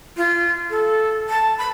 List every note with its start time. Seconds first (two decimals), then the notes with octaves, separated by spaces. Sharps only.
0.17 F4
0.70 A4
1.30 A5
1.58 B5